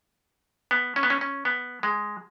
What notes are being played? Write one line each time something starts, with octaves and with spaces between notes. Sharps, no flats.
B3
C#4
B3
C#4
C#4
B3
G#3